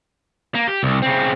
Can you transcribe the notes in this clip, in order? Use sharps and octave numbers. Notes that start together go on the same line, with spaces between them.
A#3
G4
C2
C#3 C4